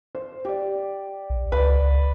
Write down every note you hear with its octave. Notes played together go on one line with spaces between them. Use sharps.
C5
G4 D5
B1
C#2 B4 D5